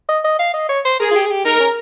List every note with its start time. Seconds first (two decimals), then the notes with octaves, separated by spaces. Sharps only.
0.09 D#5
0.24 D#5
0.39 F5
0.54 D#5
0.69 C#5
0.85 C5
1.00 G#4 A#4
1.11 F4
1.16 G4
1.26 G#4
1.30 G4
1.45 D#4 A#4
1.60 C#4